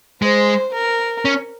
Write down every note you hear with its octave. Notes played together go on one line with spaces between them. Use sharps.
G#3 C5
A#4
C#4